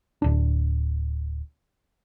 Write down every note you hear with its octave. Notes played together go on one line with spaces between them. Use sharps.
D1 D4